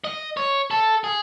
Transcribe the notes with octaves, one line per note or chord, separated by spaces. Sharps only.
D#5
C#5
A4
G#4